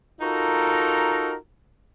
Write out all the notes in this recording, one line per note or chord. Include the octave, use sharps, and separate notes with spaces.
D#4 F4 F#4 A4 A#4